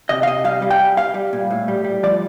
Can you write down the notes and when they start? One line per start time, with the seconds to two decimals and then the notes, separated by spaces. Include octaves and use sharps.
0.09 C3 D#5
0.23 F5
0.27 C3 D#5
0.44 G3 F5
0.62 G3
0.71 G5
0.80 G3
0.97 G3 F5
1.14 G3
1.33 A#2
1.51 A2
1.68 G3
1.84 G3
2.03 F3 D5